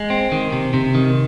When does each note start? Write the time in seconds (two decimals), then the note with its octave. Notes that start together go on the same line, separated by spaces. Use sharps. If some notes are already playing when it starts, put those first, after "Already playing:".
Already playing: G#3
0.10 C4
0.32 D#3
0.52 C3
0.74 C3
0.95 D#3